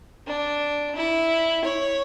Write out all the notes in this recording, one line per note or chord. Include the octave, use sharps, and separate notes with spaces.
D4
E4
C#5